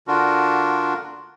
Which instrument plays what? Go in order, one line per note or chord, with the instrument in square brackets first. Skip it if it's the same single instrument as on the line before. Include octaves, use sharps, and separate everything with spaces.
[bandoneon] D3 D4 F4 F#4 A#4